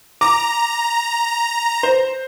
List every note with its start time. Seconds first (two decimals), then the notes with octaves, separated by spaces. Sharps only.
0.21 A#5 D6
1.83 C5